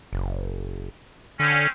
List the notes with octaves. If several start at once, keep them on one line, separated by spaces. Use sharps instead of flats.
F#1
D3 C4 C#4